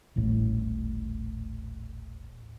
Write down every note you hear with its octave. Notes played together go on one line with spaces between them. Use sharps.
D#1 A1 A2